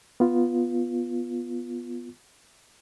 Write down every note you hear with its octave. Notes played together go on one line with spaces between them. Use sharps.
B3 F4